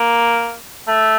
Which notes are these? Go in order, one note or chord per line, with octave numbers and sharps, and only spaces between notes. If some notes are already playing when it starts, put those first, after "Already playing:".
Already playing: A#3
A3